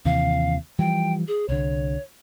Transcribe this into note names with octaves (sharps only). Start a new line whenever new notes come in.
D#2 C3 E3 F5
E3 F3 G3 G5
G#4
C2 D3 C#5